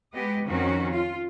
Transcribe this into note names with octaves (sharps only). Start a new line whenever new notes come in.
G#3 B3 G4 D#5
F2 D#3 C4 C#4 F#4
F4